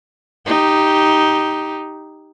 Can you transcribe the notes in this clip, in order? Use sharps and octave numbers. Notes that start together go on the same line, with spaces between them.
D#4 G4